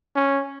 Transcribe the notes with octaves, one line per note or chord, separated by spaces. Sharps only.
C#4